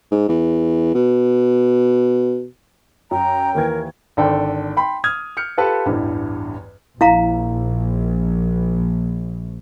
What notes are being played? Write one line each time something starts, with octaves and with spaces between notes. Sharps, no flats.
G#2
E2
B2
F#2 G5 A#5
D#2 E3 A#4 G#6
G#1 D3 A4 D5 G5 C6
G5 B5 C6
D#6 F6 G#6
F6 G6 C#7
F4 G4 A4 B4 A5
A1 E2 G2
A#1 E4 F5 A#5